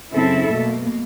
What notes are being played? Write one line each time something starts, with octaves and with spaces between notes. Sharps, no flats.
F#2 C#3 C4 E4 A4 E5
B2 A3 A#3